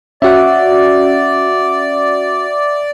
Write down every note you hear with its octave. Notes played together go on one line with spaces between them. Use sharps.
C#4 F#4 D5 E5 F#5